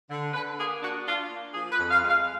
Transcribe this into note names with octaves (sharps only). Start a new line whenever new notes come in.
D3
D3 B4
A#3 G#4
D4 F#4
D4 F4
A#3
F3 G#4
B4
F2
F5
G#3 F5